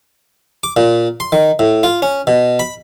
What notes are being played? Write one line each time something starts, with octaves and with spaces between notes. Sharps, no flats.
D6
A#2
C6
D#3
A2
F4
C#4
B2
B5